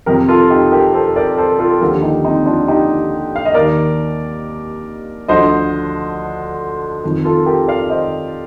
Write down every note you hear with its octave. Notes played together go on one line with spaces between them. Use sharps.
F2 C3 F3 G4 A#4
F4 A4
D#4 G4
G4 A#4
A4 C5
A#4 D5
A4 C5
F4 A4
D#2 D3 F3 G4 A#4
D#4 G4
C4 D#4
D4 F4
D#4 G4
F5
D#5
D#2 D#3 A#4 D5
D2 D3 F3 C5 D#5
F2 D#3
F4 A4
G4 A#4
D5 F5
C5 D#5